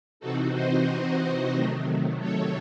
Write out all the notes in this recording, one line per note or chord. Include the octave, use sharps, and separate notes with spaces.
C3 E3 C4 D#4 F#4 A4
C5 D#5
C3 D#3 F#3 A3
A4 C#5